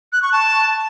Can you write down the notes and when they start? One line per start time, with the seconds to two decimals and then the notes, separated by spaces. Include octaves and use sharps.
0.13 F#6
0.22 C#6
0.32 A5